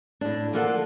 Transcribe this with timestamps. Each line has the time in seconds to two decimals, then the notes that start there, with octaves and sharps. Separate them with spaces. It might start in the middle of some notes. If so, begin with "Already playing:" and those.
0.21 A2 D4
0.53 D3 F3 A#3 F4 A4 F#5